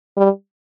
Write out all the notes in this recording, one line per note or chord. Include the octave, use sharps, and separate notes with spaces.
G3